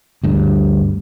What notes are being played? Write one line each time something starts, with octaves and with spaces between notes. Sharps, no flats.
D2 G2